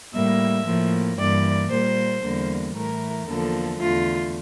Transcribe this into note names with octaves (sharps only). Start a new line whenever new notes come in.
A2 G3 A#3 E5
A2 F3 A#3
G2 E3 A#3 D5
A#2 G3 A#3 C5
E2 D3 G3 A#3
A2 E3 A3 A#4
E2 D3 F3 A#3 A4
E2 D3 A3 F4